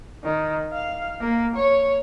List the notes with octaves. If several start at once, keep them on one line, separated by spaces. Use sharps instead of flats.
D#3
F5
A#3
C#5